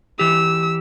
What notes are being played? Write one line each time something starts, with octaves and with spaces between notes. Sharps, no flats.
E3 G4 E6